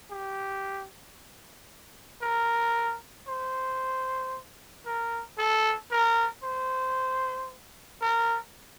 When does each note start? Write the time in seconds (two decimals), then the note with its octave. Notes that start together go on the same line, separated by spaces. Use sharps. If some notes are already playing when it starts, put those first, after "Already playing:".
0.11 G4
2.22 A#4
3.28 C5
4.86 A#4
5.38 A4
5.91 A#4
6.44 C5
8.02 A#4